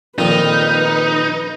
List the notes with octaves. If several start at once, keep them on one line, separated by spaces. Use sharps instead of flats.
F2 A#2 D#3 D#4 B4